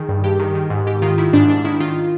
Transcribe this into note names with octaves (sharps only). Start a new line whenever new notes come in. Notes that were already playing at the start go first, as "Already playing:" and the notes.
Already playing: D#3 G#4
G2
G2 G4
D#3
D#3
G#2
G#2 G4
D#3 F4
D#3 E4
G#2 D4
G#2 D4
D#3 E4
D#3 F4